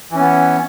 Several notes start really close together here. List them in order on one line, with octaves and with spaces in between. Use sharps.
E3 C#4 B3